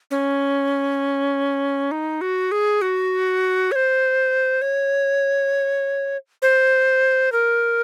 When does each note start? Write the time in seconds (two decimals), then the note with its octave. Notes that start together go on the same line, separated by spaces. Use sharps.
0.11 C#4
1.91 D#4
2.21 F#4
2.52 G#4
2.82 F#4
3.72 C#5
3.76 C5
4.62 C#5
6.42 C5
7.32 A#4